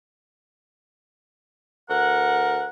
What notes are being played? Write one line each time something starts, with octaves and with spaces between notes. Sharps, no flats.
D2 A#4 F#5